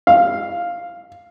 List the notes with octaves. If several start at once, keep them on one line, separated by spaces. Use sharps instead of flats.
F5